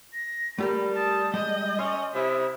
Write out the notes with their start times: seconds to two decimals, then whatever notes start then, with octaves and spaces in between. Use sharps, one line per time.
0.14 A#6
0.58 G3 A3 G4 A#4 B5
0.96 A5 D#6
1.34 G3 G#3 D#5 G6
1.79 C#4 G#5 C6
2.14 C3 E4 D#6